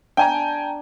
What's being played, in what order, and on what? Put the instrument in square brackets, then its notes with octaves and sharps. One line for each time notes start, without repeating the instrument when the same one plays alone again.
[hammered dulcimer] D4 [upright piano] G5 G#5 A#5